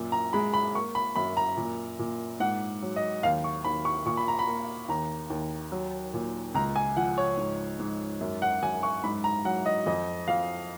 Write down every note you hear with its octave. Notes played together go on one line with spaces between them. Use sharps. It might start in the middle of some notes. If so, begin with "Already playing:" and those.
Already playing: F#2 A#2
A#5
G#3 B5
B5
A#3 C#6
B5
F#2 B5
A#5
A#2
A#2
G#2 F#5
F#3
D#5
D#2 F5
C#6
D#2 B5
C#6
A#2 C#6
B5
A#5
B5
A#3
D#2 A#5
D#2
F#3
A#2
C#2 A#5
G#5
F3 F#5
C#5
G#2
G#2
F#2
F#5
F#2 G#5
C#6
G#2 B5
A#5
F#3 F#5
D#5
F2 D#5
F2 F5